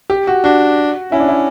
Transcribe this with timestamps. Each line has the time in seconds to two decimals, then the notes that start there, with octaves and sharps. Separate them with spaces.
0.10 G4
0.27 F#4
0.44 D4 F#4
1.11 C#4 E4
1.20 D4
1.29 E4